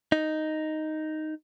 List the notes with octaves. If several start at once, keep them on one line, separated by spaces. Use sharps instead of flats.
D#4